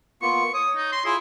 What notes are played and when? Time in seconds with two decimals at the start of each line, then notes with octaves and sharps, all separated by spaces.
0.22 A#3 B3 F4 C#6
0.54 C#5 D#6
0.77 D#4
0.92 C6
1.05 E4 F4 G#4 D#6